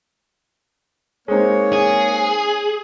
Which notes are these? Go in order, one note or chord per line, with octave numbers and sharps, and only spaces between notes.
G#3 A#3 C4 D#4 C#5
G#4